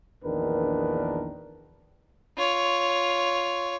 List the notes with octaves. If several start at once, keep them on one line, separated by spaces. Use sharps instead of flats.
A#1 E2 D#3 D4 A#4 B4
F4 C#5